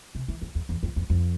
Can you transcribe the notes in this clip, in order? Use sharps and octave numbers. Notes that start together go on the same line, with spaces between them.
C3
E3
F2
E2
E2
F2
F2
F2